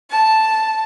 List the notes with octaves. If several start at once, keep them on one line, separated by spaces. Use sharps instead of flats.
A5